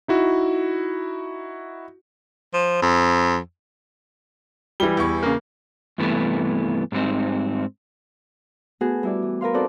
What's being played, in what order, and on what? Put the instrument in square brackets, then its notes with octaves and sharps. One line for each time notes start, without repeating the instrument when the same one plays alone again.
[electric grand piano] D#4 E4 F#4
[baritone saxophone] F3
F2
[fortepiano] E3 G3 [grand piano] G7
[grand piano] E2 C#6
[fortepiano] C#3 A#3
[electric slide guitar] G2 C3 E3 A3 B3
G#2 G3 B3 C4 D#4
[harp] A3 B3 F#4 G#4
G3 E4 D5
E3
A#4 B4 F5 C6
C4 D#4 F#4 A4 D5